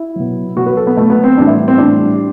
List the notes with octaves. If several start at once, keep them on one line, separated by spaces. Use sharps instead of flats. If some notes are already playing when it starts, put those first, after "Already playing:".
Already playing: E4
B2 F#3
B2 F#3 F#4
B4
A4
B3
B2 F#3 A3
B3
C4
A2 E3 G3 D4
E4
C4
A2 E3 G3 D4